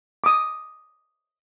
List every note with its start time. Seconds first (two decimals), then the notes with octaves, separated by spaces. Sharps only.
0.24 D6 D#6